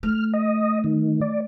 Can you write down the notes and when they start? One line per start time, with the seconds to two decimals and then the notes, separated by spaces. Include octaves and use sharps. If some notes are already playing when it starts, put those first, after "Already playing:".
0.03 A3 F6
0.34 D#5
0.84 D#3
1.21 D5